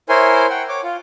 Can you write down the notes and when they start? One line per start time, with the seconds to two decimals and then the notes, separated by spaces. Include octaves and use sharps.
0.09 E4 A#4 C5 C#5 G#5 C6
0.50 F#5 G5
0.69 C#5 D6
0.83 F4